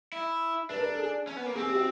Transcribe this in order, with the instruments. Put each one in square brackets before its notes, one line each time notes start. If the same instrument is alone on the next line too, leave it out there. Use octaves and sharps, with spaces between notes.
[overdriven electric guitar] E4
[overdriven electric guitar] D4 [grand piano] B4
[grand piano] A#4
A4
G#4
[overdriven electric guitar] C#4
B3
A#3
[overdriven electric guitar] C4 [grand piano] G#4
[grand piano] G4
F#4